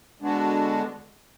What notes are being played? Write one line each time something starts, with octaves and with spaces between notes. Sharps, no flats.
D3 G#3 B3 D4 F#4